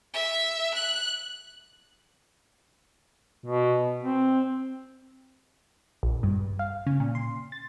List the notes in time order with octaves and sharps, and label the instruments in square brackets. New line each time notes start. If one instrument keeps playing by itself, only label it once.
[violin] E5
F#6
[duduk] B2
C4
[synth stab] A#1
G2
F5
C#3
A#2
C6
A6